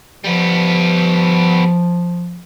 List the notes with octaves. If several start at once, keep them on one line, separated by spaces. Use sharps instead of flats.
F3 G3 B3